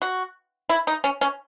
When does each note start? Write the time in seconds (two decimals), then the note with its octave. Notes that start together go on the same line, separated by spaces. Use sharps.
0.02 F#4
0.69 E4
0.87 D#4
1.04 C#4
1.21 C#4